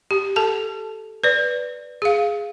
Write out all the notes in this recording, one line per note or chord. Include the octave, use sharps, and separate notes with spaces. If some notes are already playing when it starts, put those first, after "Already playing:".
G4
A4 A5
B4 D5
G#4 F5